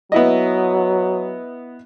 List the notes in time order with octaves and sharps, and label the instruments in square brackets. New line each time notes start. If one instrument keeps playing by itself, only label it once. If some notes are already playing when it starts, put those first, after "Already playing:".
[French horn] F#3 [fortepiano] B3 E4 D#5